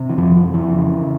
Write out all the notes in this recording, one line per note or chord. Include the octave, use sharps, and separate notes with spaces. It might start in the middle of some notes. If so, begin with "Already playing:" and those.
Already playing: C3
E3
F2 F3
F3
F2
E3
C#3
C#3